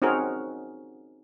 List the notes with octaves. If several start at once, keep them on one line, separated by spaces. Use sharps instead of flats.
C4 C#4 D#4 F#4 G#4 A#4